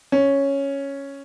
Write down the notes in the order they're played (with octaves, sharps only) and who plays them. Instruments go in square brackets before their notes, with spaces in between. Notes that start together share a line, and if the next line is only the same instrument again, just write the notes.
[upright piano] C#4